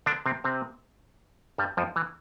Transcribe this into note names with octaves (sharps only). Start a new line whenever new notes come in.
D3 D4
C3 C4
C3 C4
G2 G3
F2 F3
E3